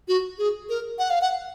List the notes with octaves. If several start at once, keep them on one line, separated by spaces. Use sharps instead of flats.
F#4
G#4
A#4
F#5
F5
F#5